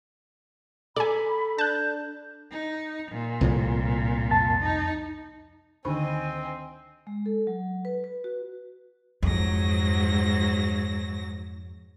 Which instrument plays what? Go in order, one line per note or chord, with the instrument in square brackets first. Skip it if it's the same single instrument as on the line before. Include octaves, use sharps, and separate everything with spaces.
[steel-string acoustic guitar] A4 A#5 [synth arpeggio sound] D5 G#5 [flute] B5
[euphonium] D4 [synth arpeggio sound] A5 F#6 [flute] G6
[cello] D#4
A#2
[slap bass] C2 A2 F3
[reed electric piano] F2 A5 A6
[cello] D#4
[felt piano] D2 [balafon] D#3 D#4 B5 [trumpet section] C4 [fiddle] D#5 G#5
[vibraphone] G#3
A4
F#3
B4
B4
F#4
[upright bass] F2 [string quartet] G#2 F#3 A#6